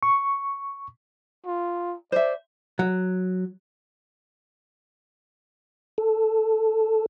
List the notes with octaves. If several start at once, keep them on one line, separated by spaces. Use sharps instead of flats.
C#6
F4
C5 D5 E5
F#3
A4